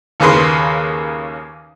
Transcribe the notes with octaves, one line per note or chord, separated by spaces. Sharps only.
D#2 C#3 A#3 B4 C6